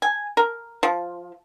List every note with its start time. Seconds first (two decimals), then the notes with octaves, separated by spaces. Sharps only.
0.02 G#5
0.37 A#4
0.83 F3